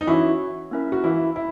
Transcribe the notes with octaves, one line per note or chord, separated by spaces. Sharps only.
D#4
E3 C#4 E4 F#4 C#5
A#3 C#4 E4 A#4 E5
F#4
E3 E4
E4